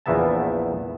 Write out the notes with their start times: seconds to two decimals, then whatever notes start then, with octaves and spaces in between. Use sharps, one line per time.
0.06 A#1 E2 A#3 B3 E5 A5